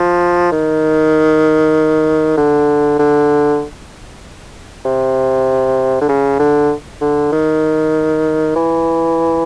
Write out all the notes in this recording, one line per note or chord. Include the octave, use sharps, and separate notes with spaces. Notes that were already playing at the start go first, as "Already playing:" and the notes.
Already playing: F3
D#3
D3
D3
C3
D3
C#3
D3
D3
D#3
E3